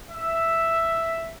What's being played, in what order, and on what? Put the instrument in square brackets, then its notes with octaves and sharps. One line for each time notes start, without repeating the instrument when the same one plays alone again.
[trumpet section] E5